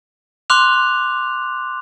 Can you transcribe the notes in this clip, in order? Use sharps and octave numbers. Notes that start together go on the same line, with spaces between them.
C6 D6 F6 F#6 F7